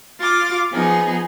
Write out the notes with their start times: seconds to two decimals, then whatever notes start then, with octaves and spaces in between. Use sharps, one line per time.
0.20 F4 D6 A6
0.72 F3 B3 D#4 G#4